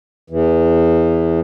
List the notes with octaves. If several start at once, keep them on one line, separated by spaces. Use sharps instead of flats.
E2 E3